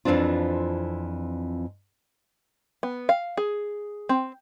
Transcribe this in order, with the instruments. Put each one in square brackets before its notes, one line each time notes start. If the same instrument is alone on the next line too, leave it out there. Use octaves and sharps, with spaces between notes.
[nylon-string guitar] F2 G#2 E3 C4 D4 F4
[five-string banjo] B3
F5
G#4
C4